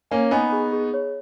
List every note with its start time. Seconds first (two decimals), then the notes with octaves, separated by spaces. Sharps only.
0.11 A#3 C#4 G#5
0.31 B3 D#4 G#5
0.52 G#4
0.72 G#4
0.94 C#5